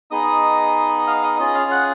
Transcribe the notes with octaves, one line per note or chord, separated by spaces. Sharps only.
B3 D#4 G#4 D#5 D#6
F5 F6
D#5 D#6
C#4 F4 G#4 D#5 D#6
F5 F6
F#5 F#6